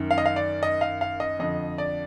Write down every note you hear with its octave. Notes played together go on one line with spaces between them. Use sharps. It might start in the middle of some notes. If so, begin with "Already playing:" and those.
Already playing: F#2 D#3
F5
D#5
F5
D5
D#5
F5
F5
D#5
F2 D3 D#5
D5